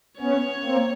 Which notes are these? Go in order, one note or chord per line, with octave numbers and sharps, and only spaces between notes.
B3 C#4 C#5
A#3 C4